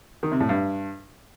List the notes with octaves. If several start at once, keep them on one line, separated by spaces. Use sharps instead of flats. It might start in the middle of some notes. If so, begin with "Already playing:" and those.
D#3
C3
A2
G2